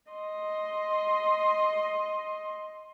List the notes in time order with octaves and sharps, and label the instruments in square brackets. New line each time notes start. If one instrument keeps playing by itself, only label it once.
[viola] D#5 C6